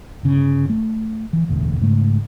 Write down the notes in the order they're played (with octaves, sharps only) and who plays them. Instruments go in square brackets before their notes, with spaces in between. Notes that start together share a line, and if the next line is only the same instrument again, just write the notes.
[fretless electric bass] G1 C#3
A3
E3
E1 A1 D2
G#2 C#3 A3